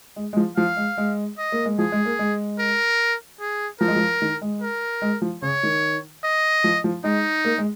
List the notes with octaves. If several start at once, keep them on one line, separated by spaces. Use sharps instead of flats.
G#3
G#3
F3
F3 F5
G#3
G#3
D#5
A#3
G#3
F3 G#4
G#3
A#3
G#3
A#4
G#4
F3 A#4
G#3
F3
D#3
G#3
A#4
G#3
F3
C#3 C#5
D#3
D#5
F3
F3
G#3 D#4
A#3
G#3